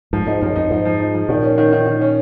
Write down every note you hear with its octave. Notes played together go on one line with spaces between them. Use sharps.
G#2 F3
G#2 D#4
F#2 F3
F2 D#4
G#2 F3
F3
D#4
F3
A#2 D#3
C#4
D#3
D#3
D#3
C#4